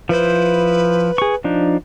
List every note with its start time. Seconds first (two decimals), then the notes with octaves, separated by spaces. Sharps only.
0.09 F3 E4 B4 C5
1.18 G#4 C#6
1.44 F3 D4 D#4